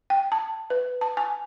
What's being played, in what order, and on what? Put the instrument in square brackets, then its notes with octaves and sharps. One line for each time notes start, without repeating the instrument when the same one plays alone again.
[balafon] G5
A5
B4
A5
G#5